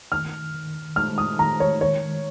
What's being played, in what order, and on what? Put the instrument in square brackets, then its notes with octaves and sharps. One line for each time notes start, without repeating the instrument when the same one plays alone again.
[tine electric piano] D#3 [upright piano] F6
[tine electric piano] D#3
[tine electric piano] G#3 [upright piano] F6
[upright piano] D#6
[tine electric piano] D#3 [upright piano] A#5
[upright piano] C#5
[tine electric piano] D#3 [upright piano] C#5